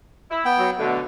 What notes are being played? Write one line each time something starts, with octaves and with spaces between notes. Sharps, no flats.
E4
B3 G5
F#3
B2 D3 A3